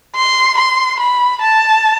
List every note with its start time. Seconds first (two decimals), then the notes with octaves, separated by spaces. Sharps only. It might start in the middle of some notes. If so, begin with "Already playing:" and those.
0.16 C6
0.58 C6
1.00 B5
1.42 A5